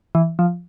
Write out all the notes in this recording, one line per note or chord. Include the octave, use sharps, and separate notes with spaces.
E3
F3